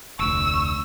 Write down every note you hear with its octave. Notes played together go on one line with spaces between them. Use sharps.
F1 D2 C#6 E6